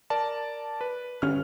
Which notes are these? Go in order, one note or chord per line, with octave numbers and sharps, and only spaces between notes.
A#4 D5 A5
B4
G1 C#4 F6